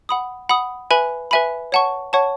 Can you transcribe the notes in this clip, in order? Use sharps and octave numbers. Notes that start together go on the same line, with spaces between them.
F#5 B5 D#6
F#5 B5 D#6
B4 E5 G#5 B5
B4 E5 G#5 B5
C#5 F#5 A5 C#6
C#5 F#5 A5 C#6